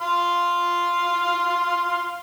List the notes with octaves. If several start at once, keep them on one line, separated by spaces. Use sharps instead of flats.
F5 C6